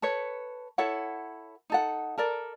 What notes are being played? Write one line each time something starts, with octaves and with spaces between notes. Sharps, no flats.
A4 B4 C#5
E4 A4 C#5 F#5
D#4 A4 F#5
A4 A#4 D5